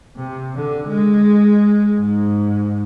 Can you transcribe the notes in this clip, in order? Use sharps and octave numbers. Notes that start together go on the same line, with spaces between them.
C3
D3
G#3
G#2